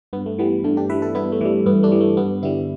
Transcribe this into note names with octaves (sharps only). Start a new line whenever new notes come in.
G2 B3
A3
E3 G3 B3
G2 A3 D4
D4 G4
E3 G3 B4 E5
E4 A4
G2 B3 E4
A3
E3 G3
G2 B3
A3 D4
E3 G3
A3
G2 B3
D3 G3 B3 E4